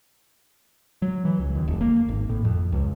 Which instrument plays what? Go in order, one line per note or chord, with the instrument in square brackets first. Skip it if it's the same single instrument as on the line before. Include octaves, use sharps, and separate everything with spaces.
[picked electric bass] F#3
E3
C#2
D#2
F1
A#3
G#1
A2
F2
C#2